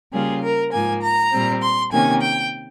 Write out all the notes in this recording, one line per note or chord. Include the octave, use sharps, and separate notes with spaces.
C#3 G3 A#3 F4 G#4
A#4
G#2 F3 A#3 G#5
A#5
A#2 G3 C4
C6
C3 D#3 A#3 C#4 G#5
G5